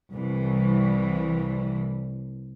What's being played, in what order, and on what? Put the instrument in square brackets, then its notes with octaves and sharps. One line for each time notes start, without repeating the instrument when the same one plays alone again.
[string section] C2 E3